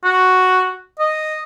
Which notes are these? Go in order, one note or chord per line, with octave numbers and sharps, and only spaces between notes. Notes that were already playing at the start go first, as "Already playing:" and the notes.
F#4
D#5